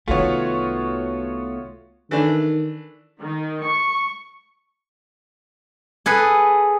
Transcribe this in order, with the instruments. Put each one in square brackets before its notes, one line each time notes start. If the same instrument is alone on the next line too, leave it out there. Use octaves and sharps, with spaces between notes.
[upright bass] C2 D#3 [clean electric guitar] A3 B3 [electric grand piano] F4 F#4 C#5
[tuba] D#3 [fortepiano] E3 A3 D4
[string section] D#3
C#6
[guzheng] G#4 A4 B4